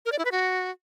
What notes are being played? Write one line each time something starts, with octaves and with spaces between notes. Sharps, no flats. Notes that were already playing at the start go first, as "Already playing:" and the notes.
A#4
D5
E4
B4
F#4